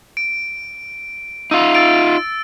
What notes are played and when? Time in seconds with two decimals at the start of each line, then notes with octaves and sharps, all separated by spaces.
0.17 D7
1.51 D#4 F4 E6
1.75 E6 A6 D7